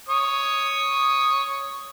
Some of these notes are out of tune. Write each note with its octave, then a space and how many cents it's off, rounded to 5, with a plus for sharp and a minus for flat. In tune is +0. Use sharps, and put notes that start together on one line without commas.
C#5 +0 D#6 +0